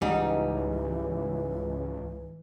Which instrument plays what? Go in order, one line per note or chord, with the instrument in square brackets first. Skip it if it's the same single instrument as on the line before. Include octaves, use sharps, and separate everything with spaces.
[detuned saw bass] C#2 [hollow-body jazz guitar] G#2 G3 D#4 [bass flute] E3